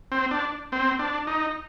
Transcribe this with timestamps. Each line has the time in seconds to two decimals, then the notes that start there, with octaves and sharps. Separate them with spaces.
0.12 C4
0.31 D4
0.72 C4
0.99 D4
1.27 D#4